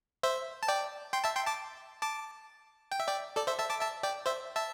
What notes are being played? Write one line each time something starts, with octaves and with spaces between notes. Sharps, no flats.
C5 E5
A5
D5 G5
G5 C6
E5 A5
G5 C6
A5 D6
A5 D6
G5
E5
D5 G5
A4 D5
C5 E5
E5 A5
A5 D6
E5 A5
D5 G5
C5 E5
E5 A5